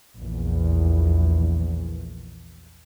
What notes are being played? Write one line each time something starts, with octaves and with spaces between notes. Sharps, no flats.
A#1 E2